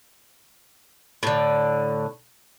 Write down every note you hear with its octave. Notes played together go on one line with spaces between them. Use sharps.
A2 D3